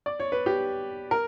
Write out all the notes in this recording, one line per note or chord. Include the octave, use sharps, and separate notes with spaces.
D5
C#5
B4
G4
A#4